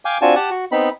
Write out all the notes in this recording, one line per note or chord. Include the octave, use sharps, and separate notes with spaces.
F5 G5 G#5 D6
C4 D4 F4 F#4 G#5 A5
G4 F#5 A5
F#4
B3 C4 D#4 B5